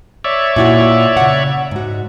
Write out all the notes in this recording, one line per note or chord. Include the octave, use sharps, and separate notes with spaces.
C#5 D5 E5
A#2 E4 F#4
C#3 F#5
G#2 F#4